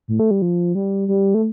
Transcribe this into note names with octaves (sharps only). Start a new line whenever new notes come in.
A2
A3
G3
F3
G3
G3
A3